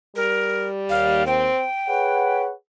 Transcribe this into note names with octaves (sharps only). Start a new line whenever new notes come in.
G3 A#4
D#2 F5
C4 G5
G#4 B4 C#5 F#5